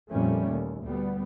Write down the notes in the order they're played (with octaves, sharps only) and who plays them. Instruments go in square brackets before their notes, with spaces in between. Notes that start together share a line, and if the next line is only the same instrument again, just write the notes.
[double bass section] F2 A#2 G3 A3 C#4
D#2
D2 G3 B3